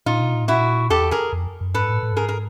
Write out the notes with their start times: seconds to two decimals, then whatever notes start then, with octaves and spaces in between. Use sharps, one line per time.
0.06 A#2 D#4 F4
0.20 B2
0.34 A#2
0.43 A2
0.48 A#2 E4 F#4
0.90 E2 G4 A4
1.11 G#4 A#4
1.32 F2
1.61 F#2
1.74 G#2 A4 B4
1.89 A2
2.03 A2
2.12 G2
2.16 G#2 G#4 A#4
2.29 A#4